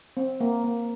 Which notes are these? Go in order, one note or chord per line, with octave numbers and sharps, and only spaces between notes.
C4
A#3
A#3